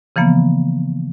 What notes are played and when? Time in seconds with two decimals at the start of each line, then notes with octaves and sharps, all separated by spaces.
0.16 C#3 E3 F3 A#3 B3